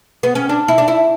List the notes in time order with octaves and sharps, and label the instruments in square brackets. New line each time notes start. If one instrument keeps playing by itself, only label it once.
[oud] B3
C#4
D4
E4
D4
E4